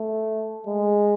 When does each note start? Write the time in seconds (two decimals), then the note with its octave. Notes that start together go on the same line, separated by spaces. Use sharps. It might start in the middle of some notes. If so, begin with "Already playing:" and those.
Already playing: A3
0.67 G#3